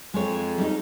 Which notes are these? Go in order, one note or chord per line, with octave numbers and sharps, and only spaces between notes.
F2 G#3 C#5
G3 D#4